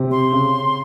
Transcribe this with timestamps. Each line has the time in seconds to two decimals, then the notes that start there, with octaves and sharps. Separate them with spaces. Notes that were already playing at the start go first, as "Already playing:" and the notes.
Already playing: C3 C4
0.11 C6
0.32 C#3